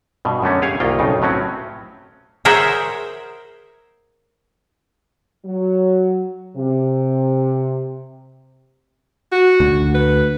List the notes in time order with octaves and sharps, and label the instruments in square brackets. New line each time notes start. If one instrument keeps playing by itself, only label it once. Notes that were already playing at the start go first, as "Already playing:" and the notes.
[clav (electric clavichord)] G2 B2
F#2 D3 A3 C#4
G4 G#4 C#5 F5 G#5
C2 D#3 A#3 F4 G5
B1 F2 C#3 D#4
A2 F#3 C4 C#4
[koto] G#4 A#4 C5 C#5 E5 F#5
[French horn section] F#3
C3
[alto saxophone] F#4
[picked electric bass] D2
[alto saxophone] B4